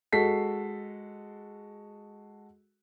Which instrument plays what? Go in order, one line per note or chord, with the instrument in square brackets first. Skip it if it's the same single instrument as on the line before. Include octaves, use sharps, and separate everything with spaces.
[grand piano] G#3 F#4 A4 B6 C7